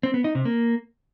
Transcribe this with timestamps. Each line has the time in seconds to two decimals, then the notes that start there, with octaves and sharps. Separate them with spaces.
0.03 C4
0.14 B3
0.24 D#4
0.35 C3
0.45 A#3